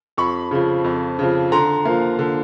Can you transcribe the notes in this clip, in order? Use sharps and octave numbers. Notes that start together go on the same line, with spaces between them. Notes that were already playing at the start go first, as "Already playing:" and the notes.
F2 B5 C#6
C#3 F3
F2
C#3 F3
D3 A#5 C6
F3 A#3
D3